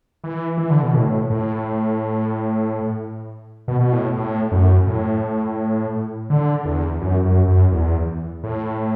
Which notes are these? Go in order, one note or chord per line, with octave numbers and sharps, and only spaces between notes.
E3
E3
D3
B2
A2
A2
B2
B2
A2
A2
F#2
A2
D3
E2
F#2
F#2
F#2
E2
A2